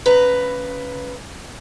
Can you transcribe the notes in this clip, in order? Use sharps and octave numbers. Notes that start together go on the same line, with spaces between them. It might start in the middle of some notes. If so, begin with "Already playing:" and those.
C#3 B4 A#5